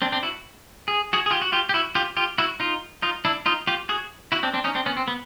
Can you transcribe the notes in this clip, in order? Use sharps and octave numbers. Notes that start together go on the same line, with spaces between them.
C4 D4
C4 D4
E4 F#4
G#4
F#4 G#4
G#4
F4 G4
F#4
F4 G4
G4
E4 F#4
F4 G4
F4 G4
E4 F#4
D#4 F4
D#4 F4
D4 E4
D#4 F4
F4 G4
F#4 G#4
E4 F#4
C4 D4
C4 D4
C#4 D#4
C4 D4
B3 C#4
C4
B3